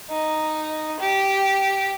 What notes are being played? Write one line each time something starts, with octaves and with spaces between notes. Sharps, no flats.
D#4
G4